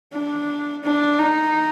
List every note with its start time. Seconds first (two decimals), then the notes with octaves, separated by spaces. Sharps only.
0.13 D4
0.84 D4
1.19 D#4